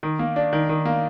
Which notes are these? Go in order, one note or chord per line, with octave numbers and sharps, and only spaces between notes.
D#3
A#3
D4
D#3
D#3
A#3